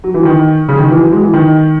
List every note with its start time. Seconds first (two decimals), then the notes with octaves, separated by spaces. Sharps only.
0.04 F#3
0.14 E3
0.25 D#3
0.68 C#3
0.79 D#3
0.90 E3
1.01 F#3
1.12 G#3
1.23 E3
1.33 D#3